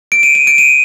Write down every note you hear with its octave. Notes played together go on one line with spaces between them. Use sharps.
D7
D#7
D#7
D7
D#7